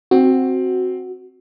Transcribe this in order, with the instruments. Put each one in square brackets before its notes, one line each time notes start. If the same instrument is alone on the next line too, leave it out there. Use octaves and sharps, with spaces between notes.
[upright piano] C4 [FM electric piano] F#4